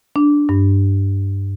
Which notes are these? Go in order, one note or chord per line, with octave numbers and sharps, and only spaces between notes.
D4
G2